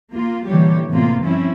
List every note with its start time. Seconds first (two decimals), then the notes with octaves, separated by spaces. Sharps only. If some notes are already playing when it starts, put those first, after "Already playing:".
0.12 A#3 F4
0.46 A#2 D3 E3 G3 G4 C#5
0.90 A2 C3 A#3 B3 F4
1.23 G2 F3 C4 C#4 E4